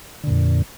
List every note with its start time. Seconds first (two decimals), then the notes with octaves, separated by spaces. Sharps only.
0.24 D3
0.27 A#2
0.31 F2